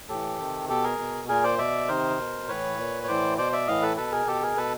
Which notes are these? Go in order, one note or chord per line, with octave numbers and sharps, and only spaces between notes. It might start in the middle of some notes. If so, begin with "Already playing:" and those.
A2 E3 G4 A4
C3 D#3
B2 G4 A4
G#4 A#4
B2
A#2 G#4 A#4
C5 D5
B2 D5 E5
C3 D#3 A#4 C5
B2
A2 E3 B4 C#5
A#2
C#5
A2 E3 C5 D5
B2 C5 D5
D5 E5
A2 E3 D#5 F5
A4 B4
B2 A4 B4
G#4 A#4
B2 G4 A4
G#4 A#4
B2 A4 B4